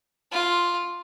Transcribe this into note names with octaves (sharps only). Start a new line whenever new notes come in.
F4